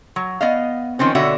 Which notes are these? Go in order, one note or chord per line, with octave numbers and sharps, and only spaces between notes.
F#3
B3 D#5 F5
D#3 F3 C4 C#4
B2 D3 F#4 C#5 E5